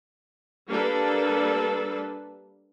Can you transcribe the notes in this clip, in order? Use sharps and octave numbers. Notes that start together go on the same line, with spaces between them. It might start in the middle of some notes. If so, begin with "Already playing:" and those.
G3 A#3 D4 A4 B4